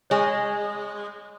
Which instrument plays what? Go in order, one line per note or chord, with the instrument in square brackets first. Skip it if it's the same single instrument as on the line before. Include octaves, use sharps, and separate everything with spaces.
[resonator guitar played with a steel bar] G#3 [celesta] C#5 G#5 C#6